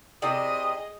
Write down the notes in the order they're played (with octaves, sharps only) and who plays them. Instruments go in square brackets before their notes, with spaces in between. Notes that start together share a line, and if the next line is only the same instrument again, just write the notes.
[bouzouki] C3 [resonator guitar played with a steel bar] E4 D5 [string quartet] G#4 D#5 [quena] D#6